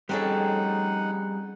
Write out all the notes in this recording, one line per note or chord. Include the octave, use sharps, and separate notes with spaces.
G3 C4 C#4 D#4 G#4 A4 F#5